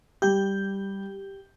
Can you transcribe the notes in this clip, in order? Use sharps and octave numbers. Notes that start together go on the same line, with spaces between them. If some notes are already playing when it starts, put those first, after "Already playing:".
G3 G4 G6